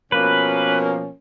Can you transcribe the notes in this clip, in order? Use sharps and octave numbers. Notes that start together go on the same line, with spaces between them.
B2 F3 A#3 C#4 B4